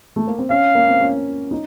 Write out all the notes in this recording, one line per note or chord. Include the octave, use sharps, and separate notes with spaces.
A3
A#3
C4
C#4 F5
A#3
C4
C#4
D#4